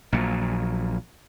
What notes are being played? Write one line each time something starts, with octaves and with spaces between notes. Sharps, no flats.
A#1 A#2 F#3